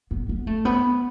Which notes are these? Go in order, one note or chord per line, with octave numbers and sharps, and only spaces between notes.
B3
B3
A3
B3